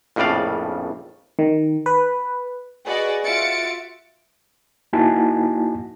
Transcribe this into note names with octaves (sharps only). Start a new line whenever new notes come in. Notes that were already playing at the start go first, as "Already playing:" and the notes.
A#1 F2 A2 C#3 D5 F5
D#3
B4
F#4 G#4 B4 D5 D#5
F4 F#4 E5 A6 C#7 D7
A#3 D#4 E4 F#4 G#5 A5